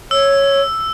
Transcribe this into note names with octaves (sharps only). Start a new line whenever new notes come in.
C#5 E6